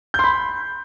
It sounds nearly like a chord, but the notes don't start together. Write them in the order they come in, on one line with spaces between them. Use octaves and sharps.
G6 C6 B5